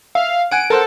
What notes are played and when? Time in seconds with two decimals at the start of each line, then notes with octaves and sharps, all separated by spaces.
0.15 E5 F5
0.51 F#5 G#5 D7
0.70 A4 A#4 C5 F#5